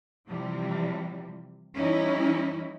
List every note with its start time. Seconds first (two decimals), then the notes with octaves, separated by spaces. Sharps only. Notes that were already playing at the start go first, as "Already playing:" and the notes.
0.27 C3 E3 F3 G3
1.74 E3 G3 C#4 D#4 E4